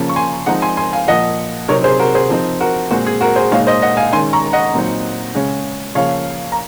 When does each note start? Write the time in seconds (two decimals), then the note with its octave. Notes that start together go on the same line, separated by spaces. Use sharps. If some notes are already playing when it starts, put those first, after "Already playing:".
Already playing: C#3 F3 A#3 C#4
0.09 C#6
0.16 G#5 C6
0.46 F3 G#3 C4 D#4 F#5 A#5
0.62 G#5 C6
0.77 G#5 C6
0.93 F5 G#5
1.08 A#2 F3 A#3 D#5 F#5
1.68 C3 F#3 C4 D#4 A#4 C#5
1.84 G#4 C5
2.00 F#4 A#4
2.15 G#4 C5
2.29 F3 C4 D#4
2.61 F#4 A#4
2.91 A#2 G#3 C4 F#4
3.07 G#4
3.21 F#4 A#4
3.36 G#4 C5
3.51 A#2 G#3 D#4 C#5 F5
3.67 C5 D#5
3.82 D#5 F#5
3.97 F5 G#5
4.12 D#3 G#3 C#4 G#5 C6
4.33 A#5 C#6
4.53 D#5 F#5
4.74 A#2 F#3 C4 D#4
5.35 C#3 G#3 C#4
5.95 C#3 F3 A#3 C#5 F5
6.52 A#5